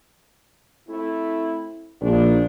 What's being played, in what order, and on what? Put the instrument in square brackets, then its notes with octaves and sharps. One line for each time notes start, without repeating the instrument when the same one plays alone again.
[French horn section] A3 C4 E4
[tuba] A#1 [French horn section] A#2 D#3 D4